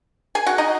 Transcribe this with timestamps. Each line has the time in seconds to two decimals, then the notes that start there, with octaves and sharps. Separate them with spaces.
0.35 G#4 G#5
0.46 F#4 F#5
0.58 D#4 D#5